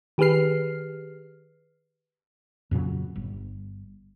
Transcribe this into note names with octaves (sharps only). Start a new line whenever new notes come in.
D#3 G4 G#4 B4 F6 C7
F2 A#2 C#3 F#3
G1